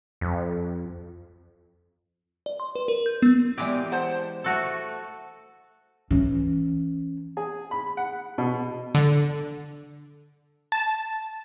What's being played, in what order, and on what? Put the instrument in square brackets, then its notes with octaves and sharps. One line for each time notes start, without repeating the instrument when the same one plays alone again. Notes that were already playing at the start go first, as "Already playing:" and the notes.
[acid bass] F2
[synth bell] D5
C6
B4
A#4
G6
B3
[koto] E3 G#3 G4 [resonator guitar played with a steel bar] F#3 D5
[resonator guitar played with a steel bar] C5 F#5 A5
[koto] A3 F#4 A4
[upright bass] E3 C#4
[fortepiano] G#4
B5
F#5
B2
[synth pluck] D3
A5